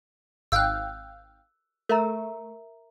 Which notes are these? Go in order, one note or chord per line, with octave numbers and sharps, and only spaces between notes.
G#1 F5 G5 E6 F#6
A3 A#4 E5 A#5